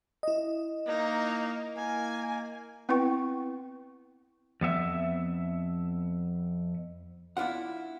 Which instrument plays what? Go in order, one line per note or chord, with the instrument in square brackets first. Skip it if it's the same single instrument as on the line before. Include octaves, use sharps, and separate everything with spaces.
[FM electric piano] E4 D#5
[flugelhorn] A#3 [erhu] D#4
[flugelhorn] A#3 [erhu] G#5
[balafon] B3 C4 E4 B4 G5 C#6
[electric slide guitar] F2 B3 E5
[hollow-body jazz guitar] B3 D4 E4 F4 F#5